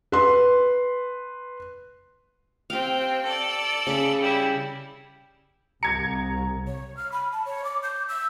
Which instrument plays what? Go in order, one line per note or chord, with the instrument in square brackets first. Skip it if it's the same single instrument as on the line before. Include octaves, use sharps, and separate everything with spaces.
[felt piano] B4 C6
[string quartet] C4 G5 [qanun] G4 F5
[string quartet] A4 D5
[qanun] C#3 B5
[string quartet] G3 E4
[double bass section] C2 [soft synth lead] A#5 [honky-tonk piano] G#6 C#7
[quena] C#5
F6
B5
A5
C#5
D6
G6
E6